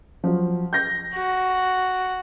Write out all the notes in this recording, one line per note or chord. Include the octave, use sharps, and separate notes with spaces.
F3 F#3
G6 A#6
F#4